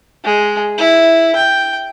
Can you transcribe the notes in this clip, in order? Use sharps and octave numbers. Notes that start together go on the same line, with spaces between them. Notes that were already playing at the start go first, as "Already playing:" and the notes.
G#3
E4
G5